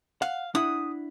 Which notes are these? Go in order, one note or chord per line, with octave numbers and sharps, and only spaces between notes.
F5 F#5
D4 E4 F#5 D#6